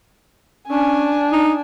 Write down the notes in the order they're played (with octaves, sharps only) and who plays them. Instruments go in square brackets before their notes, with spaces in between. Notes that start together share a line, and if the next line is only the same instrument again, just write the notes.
[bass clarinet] C#4 [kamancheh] D4 G#5
[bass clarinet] D#4